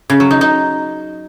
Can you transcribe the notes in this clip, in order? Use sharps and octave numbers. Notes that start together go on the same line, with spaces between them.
C#3
F#3
D#4
D#4